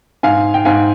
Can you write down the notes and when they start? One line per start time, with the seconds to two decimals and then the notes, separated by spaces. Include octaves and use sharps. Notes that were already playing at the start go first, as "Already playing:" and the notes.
0.23 G#2 F5 G#5
0.54 G5
0.65 G#2 F5 G#5